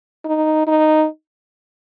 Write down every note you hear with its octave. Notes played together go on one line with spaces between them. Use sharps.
D#4
D#4